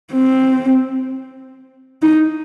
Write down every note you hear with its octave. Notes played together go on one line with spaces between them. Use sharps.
C4
D#4